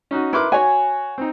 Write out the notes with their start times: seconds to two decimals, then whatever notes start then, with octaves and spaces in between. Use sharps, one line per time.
0.11 C#4 D#4 F#4
0.33 E4 A#4 B4 C6 D6
0.52 F#4 C#5 G#5
1.18 C4 D#4